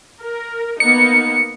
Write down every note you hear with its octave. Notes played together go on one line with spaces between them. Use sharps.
A#4
A#3 B3 D#4 C#7